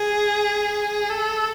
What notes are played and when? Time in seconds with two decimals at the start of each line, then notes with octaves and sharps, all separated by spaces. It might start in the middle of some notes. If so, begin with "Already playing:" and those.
Already playing: G#4
1.10 A4